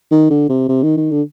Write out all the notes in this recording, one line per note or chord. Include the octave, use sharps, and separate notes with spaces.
D#3
D3
C3
C3
D#3
D#3
D3